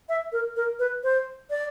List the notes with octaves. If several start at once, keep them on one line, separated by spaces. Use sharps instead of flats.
E5
A#4
A#4
B4
C5
D5